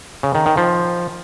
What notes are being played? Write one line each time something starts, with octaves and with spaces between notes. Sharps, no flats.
C#3
D#3
D#3
F3